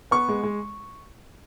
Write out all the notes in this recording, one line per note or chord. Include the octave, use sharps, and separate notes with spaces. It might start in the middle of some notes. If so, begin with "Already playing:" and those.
B3 C#6
G#3
G#3